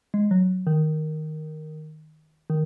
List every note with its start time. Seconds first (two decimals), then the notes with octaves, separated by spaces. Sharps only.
0.14 G#3
0.31 F#3
0.67 D#3
2.50 D#3